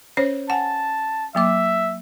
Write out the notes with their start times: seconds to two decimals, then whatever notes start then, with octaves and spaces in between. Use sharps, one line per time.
0.17 C#4 C5 C#5
0.50 F#5 G#5 A5
1.35 F#3 A#3 E5 D6